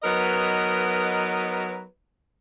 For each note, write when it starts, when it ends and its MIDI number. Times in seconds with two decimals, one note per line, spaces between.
0.03 1.82 54
0.03 1.82 59
0.03 1.82 63
0.03 1.82 70
0.03 1.82 71
0.03 1.82 75